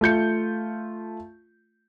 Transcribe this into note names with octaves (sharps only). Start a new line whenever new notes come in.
A3 F4 G6 C#7